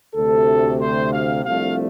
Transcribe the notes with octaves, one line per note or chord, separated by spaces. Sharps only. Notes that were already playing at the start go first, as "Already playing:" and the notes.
D2 C3 A3 A4
C5
F5
C2 C3 F3 A3 D4 F5